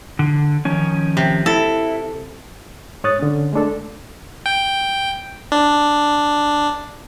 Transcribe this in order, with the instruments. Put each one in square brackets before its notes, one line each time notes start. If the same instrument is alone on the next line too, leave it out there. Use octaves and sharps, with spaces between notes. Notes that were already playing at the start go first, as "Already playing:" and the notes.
[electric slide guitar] D3
D#3 F3 C#4
[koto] C3
[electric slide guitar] E4 [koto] A4
[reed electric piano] G#2 C#5 D#6 F#6 A6
D3 C#4
G#3 A3 D4 A4
[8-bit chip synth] G5
D4